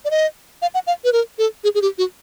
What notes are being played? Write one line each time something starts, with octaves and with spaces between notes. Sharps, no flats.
D5
D#5
F5
F#5
F5
B4
A#4
A4
G#4
G#4
G4
F#4